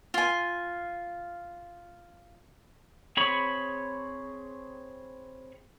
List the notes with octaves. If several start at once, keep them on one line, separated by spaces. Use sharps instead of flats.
F4 G#5
C4 G#4 C#5 B5 C#6